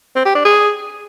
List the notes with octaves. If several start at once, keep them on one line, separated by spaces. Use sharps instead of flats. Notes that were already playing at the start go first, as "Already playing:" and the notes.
C4
G4
D4
G#4